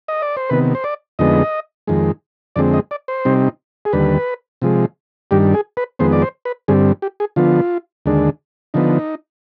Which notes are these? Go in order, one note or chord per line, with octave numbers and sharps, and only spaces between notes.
D#5
D5
C5
C3 D#3 B3 B4
C5
D5
F2 D3 G#3 B3 D#4 D#5
F2 D#3 G#3
F2 D3 G#3 C4 D5
D#5
D5
C5
C3 G3 C4 D#4
G#4
D#2 D3 G3 B4
C3 F3 G#3
G2 D#3 G3 D4 G4
G#4
B4
F2 D#3 G#3 B3 C5
D5
C5
B4
G2 D3 G3 C4 G#4
G4
G#4
D3 F3 B3 F4
D#2 D3 G#3 D4
D3 F3 B3 D#4